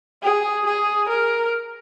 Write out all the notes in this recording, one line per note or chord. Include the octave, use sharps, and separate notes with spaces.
G#4
G#4
A#4